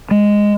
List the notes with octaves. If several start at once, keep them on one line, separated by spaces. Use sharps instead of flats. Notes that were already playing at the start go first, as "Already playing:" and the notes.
G#3